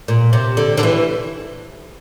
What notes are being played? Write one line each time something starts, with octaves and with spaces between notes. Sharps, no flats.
A#2
C3
D3
D3
E3